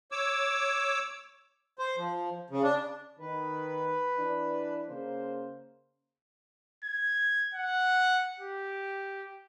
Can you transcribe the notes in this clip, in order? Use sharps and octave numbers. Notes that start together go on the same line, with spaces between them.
C#5 D6 E6
C5
F3
C#3
D4
D#3 B4
E3 D4
C#3 A#3 C5
G#6
F#5
G4